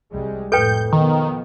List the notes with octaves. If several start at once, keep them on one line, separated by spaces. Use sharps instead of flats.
C2 G3 G#3
F2 A2 A4 B4 G5 G6
B2 D#3 F3 B3